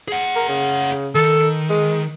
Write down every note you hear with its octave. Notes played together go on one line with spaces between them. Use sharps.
G#4 F#5
A#4
C#3
D#3 A4
G#3